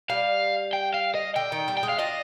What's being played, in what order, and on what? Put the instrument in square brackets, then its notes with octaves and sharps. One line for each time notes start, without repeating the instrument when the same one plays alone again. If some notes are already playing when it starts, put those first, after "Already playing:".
[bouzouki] G3 [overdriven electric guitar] F5
[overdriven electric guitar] G5
F5
D#5
[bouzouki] D3 [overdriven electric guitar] G5
[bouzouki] D#3
G3
[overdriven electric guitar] G5
[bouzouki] G#3
[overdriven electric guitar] F5
[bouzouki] D4 F4 [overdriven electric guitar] D#5